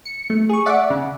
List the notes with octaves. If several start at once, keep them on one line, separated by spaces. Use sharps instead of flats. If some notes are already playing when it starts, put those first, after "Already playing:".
C#7
A3
G#4 C#6
D5 E5 F#5 D6
C#3